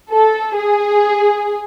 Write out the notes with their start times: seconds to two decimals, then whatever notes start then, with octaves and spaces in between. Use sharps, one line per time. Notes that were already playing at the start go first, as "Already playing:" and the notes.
0.10 A4
0.57 G#4